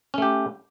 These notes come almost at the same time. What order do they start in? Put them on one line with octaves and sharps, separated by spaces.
C#4 A3 G4